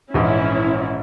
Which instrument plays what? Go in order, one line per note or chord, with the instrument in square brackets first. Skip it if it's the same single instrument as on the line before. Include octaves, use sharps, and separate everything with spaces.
[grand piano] A#1 G#2 E3 [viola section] C#4 E4